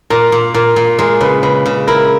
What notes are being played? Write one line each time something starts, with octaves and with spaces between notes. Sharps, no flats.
A#2 A#4
A#2
A#2 A#4
A#2
G#3 A#4
C#3 B4
C#3 B4
C#3
E4 A#4